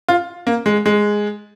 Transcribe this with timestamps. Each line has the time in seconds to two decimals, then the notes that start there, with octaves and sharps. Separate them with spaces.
0.08 F4
0.47 A#3
0.66 G#3
0.86 G#3